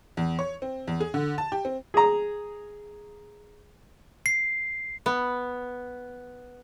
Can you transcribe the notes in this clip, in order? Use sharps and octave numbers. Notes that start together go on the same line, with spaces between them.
E2
C#5
C4
E2
G#4
D3
A5
G4
C4
G#4 A#5
C7
B3